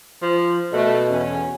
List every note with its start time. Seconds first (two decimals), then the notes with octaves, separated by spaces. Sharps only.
0.22 F3
0.73 B2 A3
1.09 E2 C#4